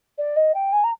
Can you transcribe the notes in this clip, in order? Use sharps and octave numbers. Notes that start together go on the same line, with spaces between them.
D5
D#5
G5
G#5
A#5